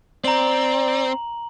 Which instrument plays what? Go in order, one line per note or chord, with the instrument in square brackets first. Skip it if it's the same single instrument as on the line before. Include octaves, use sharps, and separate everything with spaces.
[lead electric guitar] C4 [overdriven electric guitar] D5 [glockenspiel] A#5 F#7